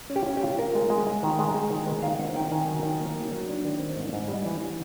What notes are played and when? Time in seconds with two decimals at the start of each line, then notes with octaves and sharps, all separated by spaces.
0.10 C#4
0.16 G4
0.26 C#4
0.37 G4
0.43 F4
0.58 F4 A#4
0.75 G#3
0.90 G#3
1.07 G#3
1.23 D#3
1.39 G#3
1.54 G#3
1.70 D#3
1.87 G#3 B4
2.03 D#3 F5
2.19 C4 F#5
2.36 D#3 G5
2.51 D#3 G#5
2.68 F#3
2.83 D#3
3.00 A#3
3.16 F#3
3.31 F#3
3.48 D4
3.65 D#3
3.80 C4
3.96 G#2
4.13 G#2
4.28 G3
4.45 E3
4.61 E3